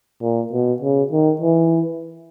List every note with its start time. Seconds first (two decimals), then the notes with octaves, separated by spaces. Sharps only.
0.22 A#2
0.53 B2
0.82 C#3
1.12 D#3
1.41 E3